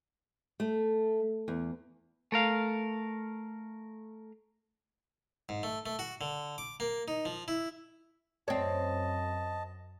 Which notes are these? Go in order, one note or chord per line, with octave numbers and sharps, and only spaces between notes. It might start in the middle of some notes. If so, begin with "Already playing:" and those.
A3
E2
A3 A#4 F5
G#2
A3
A3
F#4
D3
D6
A#3
D#4
F3
E4
F#2 C4 C#5 D#5 A5